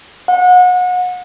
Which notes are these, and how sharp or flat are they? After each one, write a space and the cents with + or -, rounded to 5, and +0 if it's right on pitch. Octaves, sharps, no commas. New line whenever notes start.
F#5 -30